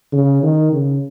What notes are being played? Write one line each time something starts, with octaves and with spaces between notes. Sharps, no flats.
C#3
D#3
C#3